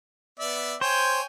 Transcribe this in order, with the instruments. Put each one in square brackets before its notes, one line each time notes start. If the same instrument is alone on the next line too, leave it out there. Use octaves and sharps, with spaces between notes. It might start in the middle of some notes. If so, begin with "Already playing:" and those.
[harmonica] B3 D5 E5
[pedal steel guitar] C5 [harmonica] C#5 G5 G#5